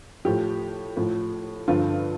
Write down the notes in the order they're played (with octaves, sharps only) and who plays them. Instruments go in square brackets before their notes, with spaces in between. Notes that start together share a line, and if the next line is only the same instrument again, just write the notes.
[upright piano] A2 F3 G4
A2 F3
G2 D3 F3 F4